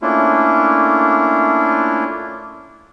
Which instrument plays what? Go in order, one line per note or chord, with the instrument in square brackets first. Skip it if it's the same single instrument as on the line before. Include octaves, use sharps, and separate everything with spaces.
[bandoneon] A3 A#3 C#4 D4 E4 F4